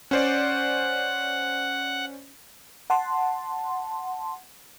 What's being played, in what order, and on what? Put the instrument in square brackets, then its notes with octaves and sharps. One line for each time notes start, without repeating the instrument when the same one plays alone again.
[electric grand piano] C#4 C5 D5 [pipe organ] F#5
[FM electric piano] F#5 A5 C6